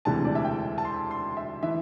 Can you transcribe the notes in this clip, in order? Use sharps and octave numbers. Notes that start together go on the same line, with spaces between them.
E1 D2 C3 E3 A5
D5
E5
G5
A5
C6
C6
E5
E3 E5